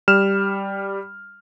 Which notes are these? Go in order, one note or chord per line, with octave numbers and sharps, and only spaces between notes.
G3 F6 E7